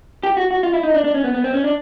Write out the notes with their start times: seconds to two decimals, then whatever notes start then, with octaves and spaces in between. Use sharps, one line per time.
0.23 G4
0.37 F#4
0.51 F#4
0.63 F4
0.73 E4
0.83 D#4
0.94 D4
1.04 D4
1.14 C#4
1.24 B3
1.34 B3
1.44 C4
1.54 C#4
1.64 D4